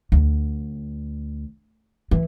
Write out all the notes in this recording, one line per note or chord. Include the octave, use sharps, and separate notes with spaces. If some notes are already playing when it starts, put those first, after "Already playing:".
D2
E3